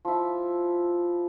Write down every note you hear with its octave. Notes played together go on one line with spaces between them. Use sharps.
F3 E4